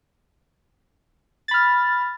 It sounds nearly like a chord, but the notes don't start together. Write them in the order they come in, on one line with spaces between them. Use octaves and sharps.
A6 B5 F6